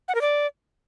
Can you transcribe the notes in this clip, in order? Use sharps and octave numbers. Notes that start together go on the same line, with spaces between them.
F#5
A#4
D5